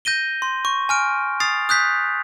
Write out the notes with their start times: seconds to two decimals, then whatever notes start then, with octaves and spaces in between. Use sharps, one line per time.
0.05 G6 A#6 D#7 G7
0.42 C6
0.65 C#6
0.89 G#5 F6 D7
1.40 D#6 A6 C7 F7
1.69 D#6 F#6 G6 B6